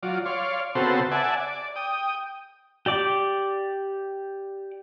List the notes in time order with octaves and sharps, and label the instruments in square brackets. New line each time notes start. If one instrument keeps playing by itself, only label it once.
[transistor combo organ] F#3 F4 D5
C#5 D5 F5 C6
C#3 B3 C4 F#4 A4 C5
D5 E5 F#5 G#5 A5
D5
G5 D#6
[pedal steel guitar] G4 D5 D6